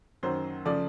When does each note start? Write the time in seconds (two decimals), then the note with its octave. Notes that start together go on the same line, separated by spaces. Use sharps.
0.23 F#2 D#3 F#3 C5
0.65 C#3 F3 A3 D5